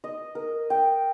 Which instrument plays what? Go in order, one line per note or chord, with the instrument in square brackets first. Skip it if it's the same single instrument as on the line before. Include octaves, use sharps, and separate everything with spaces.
[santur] D#5
A#4
G5